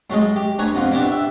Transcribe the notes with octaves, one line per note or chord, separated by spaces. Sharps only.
A2 F#3 G#3 D#5
G4
D2 B4 C#5 G#5 A#5
F2 B3 F4
D4 E4 F#4 G4 B4
E5 G5